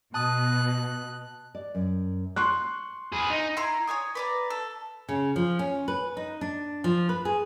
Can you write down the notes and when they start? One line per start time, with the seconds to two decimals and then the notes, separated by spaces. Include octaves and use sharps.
0.14 B2 A5 D#6 F#6
1.55 D5
1.75 F#2
2.36 C6 C#6 F#6
3.12 G#4 B4
3.30 D#4
3.57 E4 A#5 C6
3.87 C#5 D5 G#5 D#6
4.15 B4 D5 A#5
4.50 A4
5.09 C#3
5.36 F3
5.59 C#4
5.88 B4
6.17 D#4
6.41 D4
6.84 F3
7.09 B4
7.25 G#4